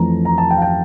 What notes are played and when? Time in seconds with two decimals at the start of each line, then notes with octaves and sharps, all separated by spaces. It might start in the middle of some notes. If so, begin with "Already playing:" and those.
Already playing: F2 E3 A3 A#5
0.25 A#5
0.38 A5
0.51 G5
0.57 F5
0.62 G5